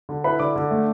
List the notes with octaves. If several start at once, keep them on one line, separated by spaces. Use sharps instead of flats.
D3
E4 B4 B5
D3 D5 D6
D3
A3